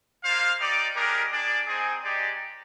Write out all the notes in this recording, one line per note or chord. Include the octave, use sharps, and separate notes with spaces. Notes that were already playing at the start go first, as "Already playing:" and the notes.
A#3 F4 C5 F5
D#4 G4 D5
G#3 D4 G4 A#4
D4 G#4 D5
C4 D#4 G#4
G#3 D#4 G4 D5